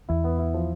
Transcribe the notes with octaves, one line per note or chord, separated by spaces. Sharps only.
E2 E4
B3
E4
F3